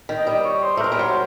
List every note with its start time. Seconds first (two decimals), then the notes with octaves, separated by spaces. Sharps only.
0.09 D#3
0.17 D#5
0.27 G3
0.45 C#5
0.63 C5
0.77 A3
0.81 G#3 A#4
0.92 G3
0.99 F#3 C5